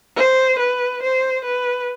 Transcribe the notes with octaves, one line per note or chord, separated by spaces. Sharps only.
C5
B4
C5
B4